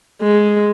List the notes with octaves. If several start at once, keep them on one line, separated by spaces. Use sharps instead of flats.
G#3